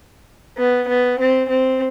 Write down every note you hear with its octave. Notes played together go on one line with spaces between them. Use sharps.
B3
B3
C4
C4